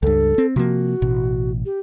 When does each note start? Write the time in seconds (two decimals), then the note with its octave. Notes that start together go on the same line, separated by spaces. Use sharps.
0.03 C#2 G2 A4
0.38 C4
0.56 C3 F3 A#3 F#4
1.02 A1 B2
1.65 G4